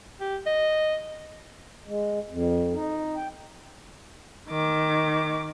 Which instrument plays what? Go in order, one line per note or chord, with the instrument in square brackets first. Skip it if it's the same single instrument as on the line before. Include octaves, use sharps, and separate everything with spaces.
[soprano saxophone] G4
D#5
[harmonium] G#3
F2
D#4
G5
[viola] D#3 D6